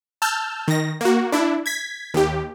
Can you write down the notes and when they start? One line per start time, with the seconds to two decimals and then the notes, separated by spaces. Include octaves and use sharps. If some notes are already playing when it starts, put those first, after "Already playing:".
0.22 A5 E6 F6 G6
0.68 D#3 A#6
1.01 A#3 F#4
1.32 D4 E4
1.66 G#6 B6
2.14 D#2 G4